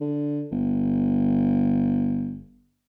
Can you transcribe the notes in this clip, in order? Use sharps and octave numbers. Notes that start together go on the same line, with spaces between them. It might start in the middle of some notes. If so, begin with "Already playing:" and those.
D3
G1